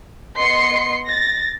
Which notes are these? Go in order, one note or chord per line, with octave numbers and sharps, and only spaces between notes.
B3 D#5 C6 C7 C#7
A6 A#6